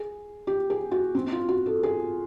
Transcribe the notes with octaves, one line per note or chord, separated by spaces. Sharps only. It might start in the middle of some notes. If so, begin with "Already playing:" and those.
Already playing: G#4
G4
G#4
F#4
C4
F4
F#4
A4
G#4